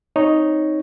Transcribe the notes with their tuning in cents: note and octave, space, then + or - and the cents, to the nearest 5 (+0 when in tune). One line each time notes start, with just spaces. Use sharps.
C4 +0 D#4 +0 C#5 +0